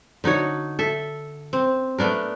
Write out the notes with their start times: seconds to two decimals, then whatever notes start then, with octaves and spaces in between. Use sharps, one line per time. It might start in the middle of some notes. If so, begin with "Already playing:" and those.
0.24 D3 D#4 F#4 C#5
0.79 A4 E5
1.53 C4
1.98 A3 B3 D4 A#4